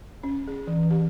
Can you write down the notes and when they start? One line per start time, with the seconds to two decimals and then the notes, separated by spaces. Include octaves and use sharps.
0.23 C#4
0.48 G#4
0.67 E3
0.90 G4